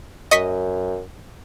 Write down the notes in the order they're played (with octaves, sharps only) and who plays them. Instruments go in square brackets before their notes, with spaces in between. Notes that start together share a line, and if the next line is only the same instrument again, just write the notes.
[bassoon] F#2 [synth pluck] D#5 C#6 B6